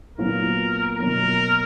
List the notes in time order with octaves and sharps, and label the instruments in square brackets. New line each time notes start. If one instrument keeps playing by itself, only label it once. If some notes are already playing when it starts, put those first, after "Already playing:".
[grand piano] A#2 F#3 B3 F4 [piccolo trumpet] A#4
[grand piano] B2 F#3 A#3 [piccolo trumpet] A#4